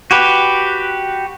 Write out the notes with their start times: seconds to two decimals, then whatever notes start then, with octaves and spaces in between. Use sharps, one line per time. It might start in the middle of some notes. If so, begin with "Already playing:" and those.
0.11 F#4 G4 B4